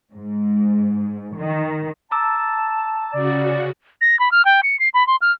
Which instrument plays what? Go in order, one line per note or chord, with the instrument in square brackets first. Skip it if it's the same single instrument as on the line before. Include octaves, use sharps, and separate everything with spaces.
[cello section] G#2
D#3
[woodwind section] A5 [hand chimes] A#5 D6 E6
[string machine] C#3 F#4 [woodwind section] D5
[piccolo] A#6
B5
F6
G5
C#7
C7
B5
C6
F6